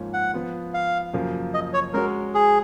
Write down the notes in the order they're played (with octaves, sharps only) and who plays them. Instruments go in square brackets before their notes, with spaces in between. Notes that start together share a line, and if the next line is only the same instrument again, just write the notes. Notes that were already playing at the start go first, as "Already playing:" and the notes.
Already playing: [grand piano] G#2 F3 A#3 C#4 F4
[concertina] F#5
[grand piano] F3 B3 F4
[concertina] F5
[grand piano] F#2 C#3 F3 A#3
[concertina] D#5
C#5
[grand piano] G#3 C#4 F#4 C#5 [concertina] A#4
[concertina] G#4